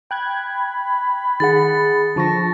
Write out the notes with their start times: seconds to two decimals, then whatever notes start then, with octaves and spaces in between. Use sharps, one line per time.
0.11 G5 B5 F#6 G#6
1.40 D#3 D#4 G#4 F#5 A6
2.16 D3 F3 A5 B5 C#6 A#6